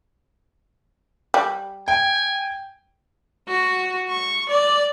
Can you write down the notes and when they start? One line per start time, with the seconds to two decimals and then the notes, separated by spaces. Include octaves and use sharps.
1.34 G3
1.88 G5 G#5
3.48 F#4
4.10 C#6
4.49 D5